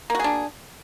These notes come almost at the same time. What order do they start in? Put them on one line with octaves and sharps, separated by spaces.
A#3 F#4 G#4 D4